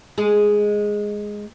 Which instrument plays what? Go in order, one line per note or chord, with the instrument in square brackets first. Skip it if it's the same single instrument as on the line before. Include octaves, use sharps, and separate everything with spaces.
[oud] G#3 G#4